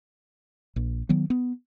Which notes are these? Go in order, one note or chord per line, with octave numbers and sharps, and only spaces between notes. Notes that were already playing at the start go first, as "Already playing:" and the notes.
A#1
D#3 F#3 B3
B3